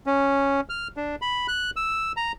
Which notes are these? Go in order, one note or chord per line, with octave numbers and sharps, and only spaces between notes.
C#4
F6
D4
B5
F#6
E6
A#5